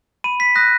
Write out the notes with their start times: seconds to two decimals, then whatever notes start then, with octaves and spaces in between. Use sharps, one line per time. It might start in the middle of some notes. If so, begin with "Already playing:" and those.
0.24 B5 D#7
0.40 B6
0.55 D#6 F#6 A#6